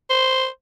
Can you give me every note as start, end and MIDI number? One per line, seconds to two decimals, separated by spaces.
0.10 0.47 72